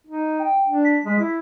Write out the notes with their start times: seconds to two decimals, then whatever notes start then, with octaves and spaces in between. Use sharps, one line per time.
0.07 D#4
0.39 G5
0.67 D4
0.84 B6
1.05 G#3
1.19 E4